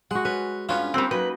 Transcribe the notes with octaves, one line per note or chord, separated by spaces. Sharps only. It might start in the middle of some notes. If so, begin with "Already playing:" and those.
G#3 F#4 F#5
C#4 B4
G2 B3 C#4 F4 B4 C#5
G3 A#3 C4 B4 G5
F#3 D#4 B4